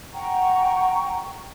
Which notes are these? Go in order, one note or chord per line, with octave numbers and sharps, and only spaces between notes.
F#5 G5 A#5 C#6